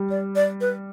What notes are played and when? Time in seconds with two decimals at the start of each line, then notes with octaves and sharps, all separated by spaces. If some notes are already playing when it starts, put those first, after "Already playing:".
Already playing: G3
0.11 D5
0.36 D5
0.61 B4